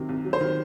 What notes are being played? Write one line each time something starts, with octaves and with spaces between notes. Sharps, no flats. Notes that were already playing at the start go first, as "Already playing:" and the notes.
Already playing: C3 D#3 F#3
C2
F#3
C5
D#3